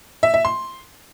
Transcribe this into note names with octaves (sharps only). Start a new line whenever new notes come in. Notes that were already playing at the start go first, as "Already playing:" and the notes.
E5
E5
C6